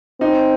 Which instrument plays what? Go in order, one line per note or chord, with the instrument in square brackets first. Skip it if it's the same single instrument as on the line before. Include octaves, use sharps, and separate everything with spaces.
[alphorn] C4 [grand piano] D#4